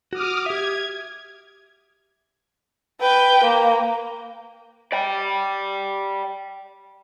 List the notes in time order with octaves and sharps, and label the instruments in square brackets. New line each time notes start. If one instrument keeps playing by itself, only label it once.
[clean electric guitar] F#4 [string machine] D6 D#6 F6
[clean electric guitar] G4 E5 [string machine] G#6
[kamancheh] B4 G5
A#3
[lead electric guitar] D5 G5